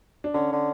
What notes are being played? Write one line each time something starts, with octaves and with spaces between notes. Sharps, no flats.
D4
D3 C#4
D3